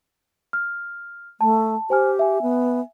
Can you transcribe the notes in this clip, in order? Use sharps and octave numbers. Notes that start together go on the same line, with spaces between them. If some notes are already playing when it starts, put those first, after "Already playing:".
F6
A3 A5
G4 C5 G#5 F6
E5 G#5
B3